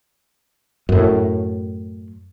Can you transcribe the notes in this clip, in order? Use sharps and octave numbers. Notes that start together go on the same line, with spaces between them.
F#2 A2